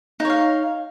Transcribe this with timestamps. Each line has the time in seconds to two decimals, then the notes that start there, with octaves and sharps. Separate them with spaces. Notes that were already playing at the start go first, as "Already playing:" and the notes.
0.20 D#4
0.25 C#5
0.30 F5